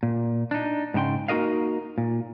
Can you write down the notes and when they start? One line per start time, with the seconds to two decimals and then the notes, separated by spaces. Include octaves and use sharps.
0.03 A#2
0.51 D4 D#4
0.94 G#2 C#3 F#4 G5 C6
1.28 A#3 D#4 F#4 A#4 D#5 F5
1.98 A#2